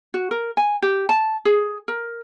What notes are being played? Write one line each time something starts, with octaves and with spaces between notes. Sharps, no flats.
F#4
A#4
G#5
G4
A5
G#4
A#4